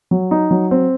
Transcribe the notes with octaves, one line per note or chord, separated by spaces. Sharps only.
F#3
D#4
F#3
C4